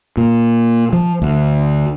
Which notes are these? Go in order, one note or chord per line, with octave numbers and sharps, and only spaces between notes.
A#2
F3
D2